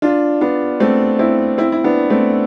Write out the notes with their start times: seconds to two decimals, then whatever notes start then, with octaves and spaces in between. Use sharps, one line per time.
0.02 D4 F4
0.41 B3 D4
0.80 A3 C4
1.19 C4 E4
1.58 C4 E4
1.72 E4
1.84 B3 D4
2.10 A3 C4